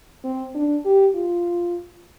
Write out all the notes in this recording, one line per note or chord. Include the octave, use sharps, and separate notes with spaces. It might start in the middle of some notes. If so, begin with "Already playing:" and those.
C4
D4
G4
F4